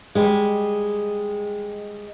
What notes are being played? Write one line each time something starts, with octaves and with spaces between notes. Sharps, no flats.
G3 G#3